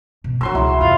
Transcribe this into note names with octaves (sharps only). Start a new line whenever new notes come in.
B2
F3 F#3 D4 C6 E6
C#2 A2 E4
F2 C3 F4